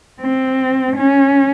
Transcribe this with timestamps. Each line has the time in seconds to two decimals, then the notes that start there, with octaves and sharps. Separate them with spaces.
0.21 C4
0.96 C#4